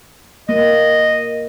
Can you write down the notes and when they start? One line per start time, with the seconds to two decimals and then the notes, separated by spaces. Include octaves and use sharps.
0.49 A#3 D#5